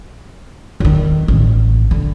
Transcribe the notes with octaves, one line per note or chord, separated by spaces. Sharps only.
E2 D#3
A1
D3